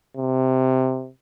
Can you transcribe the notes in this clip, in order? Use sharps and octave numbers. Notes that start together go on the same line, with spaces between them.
C3